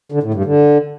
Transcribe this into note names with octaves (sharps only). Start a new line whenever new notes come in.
D3
A2
G2
D3